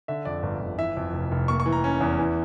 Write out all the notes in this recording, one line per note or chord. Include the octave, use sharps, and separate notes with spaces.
D3 E5
F2 D5
G1
G1
E3 E5
F2
F1
F1
A#3 C#6
C#6
E3
A#5
C#4
E2
E3